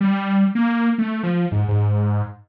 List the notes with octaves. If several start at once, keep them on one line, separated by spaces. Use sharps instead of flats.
G3
A#3
A3
F3
G#2
G#2